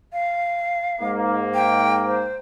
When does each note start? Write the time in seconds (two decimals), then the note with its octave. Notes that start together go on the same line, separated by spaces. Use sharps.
0.13 F5
1.02 G#2 A#3
1.54 G5
2.06 C5